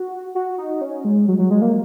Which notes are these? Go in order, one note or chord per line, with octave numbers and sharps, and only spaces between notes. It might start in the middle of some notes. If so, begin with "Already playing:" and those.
Already playing: F#4
F#4
D#4
C#4
G#3
F#3
F#3
G#3
A#3